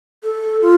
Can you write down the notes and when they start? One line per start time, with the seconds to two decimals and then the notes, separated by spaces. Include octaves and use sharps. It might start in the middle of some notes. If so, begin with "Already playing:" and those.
0.23 A4
0.61 F4